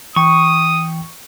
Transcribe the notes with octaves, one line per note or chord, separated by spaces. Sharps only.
E3 G5 C#6 D#6